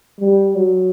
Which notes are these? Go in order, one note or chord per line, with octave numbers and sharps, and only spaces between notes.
G3
F#3